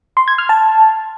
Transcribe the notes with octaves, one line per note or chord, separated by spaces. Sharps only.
C6
G#6
F6
A5